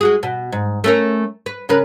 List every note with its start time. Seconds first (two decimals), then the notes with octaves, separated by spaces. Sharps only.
0.01 G#3 F#4 G#4
0.23 B2
0.52 G#2
0.84 A3 C#4 A#4
1.46 B4
1.69 C#3 A#4 B4